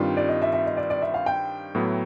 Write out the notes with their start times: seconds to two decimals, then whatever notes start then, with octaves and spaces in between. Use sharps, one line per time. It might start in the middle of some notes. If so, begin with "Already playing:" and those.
Already playing: G2 D#3 G3 C4 F4
0.17 D5
0.28 D#5
0.42 E5
0.53 E5
0.66 D#5
0.77 D5
0.90 D5
1.02 E5
1.14 F5
1.26 G5
1.75 A2 F#3 B3 E4